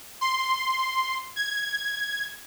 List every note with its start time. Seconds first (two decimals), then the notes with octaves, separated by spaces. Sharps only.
0.21 C6
1.36 G#6